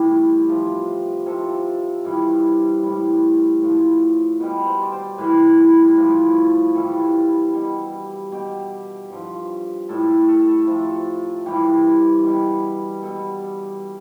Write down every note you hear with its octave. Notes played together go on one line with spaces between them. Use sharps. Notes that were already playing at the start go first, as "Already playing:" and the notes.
Already playing: A2 C3 E3 G3 E4 G4
C3 F3
C3 F3 A4
G2 E3 G3
A2 G3
A2 F3
B2 G3 B4
C5
D5
C5
A2 E3 G3 B4
A2 F3
G2 E3 G3 A4
B2 G3
B2 G3 G4
G2 F3
A2 G3 A4
A4
C3 F3
G2 E3 G3 G4
B2 G3
B2 G3 A4